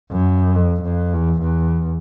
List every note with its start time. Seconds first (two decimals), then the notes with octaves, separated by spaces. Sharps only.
0.11 F#2
0.55 F2
0.83 F2
1.13 E2
1.42 E2